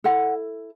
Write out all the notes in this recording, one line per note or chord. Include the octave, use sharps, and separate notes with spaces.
E4 A4 F#5